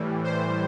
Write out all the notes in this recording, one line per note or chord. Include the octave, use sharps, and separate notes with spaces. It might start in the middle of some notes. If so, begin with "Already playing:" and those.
Already playing: A2 E3 G3
C5